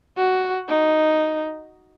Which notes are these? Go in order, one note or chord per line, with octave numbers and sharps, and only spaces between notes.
F#4
D#4